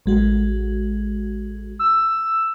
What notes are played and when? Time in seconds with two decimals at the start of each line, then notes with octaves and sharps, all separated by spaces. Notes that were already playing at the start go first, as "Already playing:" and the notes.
0.06 A1 G#3 F#4
1.79 E6